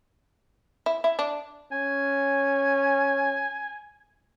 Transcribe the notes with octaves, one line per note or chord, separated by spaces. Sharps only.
E4
E4
D4
C#4 G#5